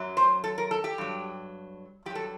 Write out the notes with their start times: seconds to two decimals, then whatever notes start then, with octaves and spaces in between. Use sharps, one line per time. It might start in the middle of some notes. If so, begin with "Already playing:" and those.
Already playing: F#2 F#3
0.17 C5
0.44 A4
0.58 A#4
0.71 A4
0.84 G4
0.98 G2 F#3
2.06 G2 G4
2.10 F#3
2.15 A4